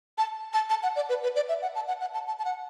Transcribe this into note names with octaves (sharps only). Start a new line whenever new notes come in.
A5
A5
A5
F#5
D5
B4
B4
D5
E5
F#5
A5
F#5
F#5
A5
A5
A5
F#5